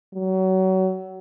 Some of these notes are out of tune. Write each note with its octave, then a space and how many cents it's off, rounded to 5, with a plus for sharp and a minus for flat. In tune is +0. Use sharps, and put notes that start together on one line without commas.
F#3 +30